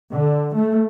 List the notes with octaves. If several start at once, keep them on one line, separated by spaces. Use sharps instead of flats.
D3
A3